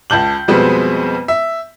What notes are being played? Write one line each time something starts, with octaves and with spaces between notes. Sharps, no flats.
C#2 A5 G6 F#7
F2 B2 G3 G#3 B3 C4
E5